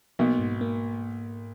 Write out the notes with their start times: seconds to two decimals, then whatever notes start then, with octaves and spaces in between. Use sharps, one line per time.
0.19 B1 B2 A#3
0.39 G#2
0.61 A#3